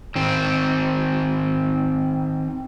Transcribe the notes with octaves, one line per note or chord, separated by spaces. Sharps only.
D#3 C4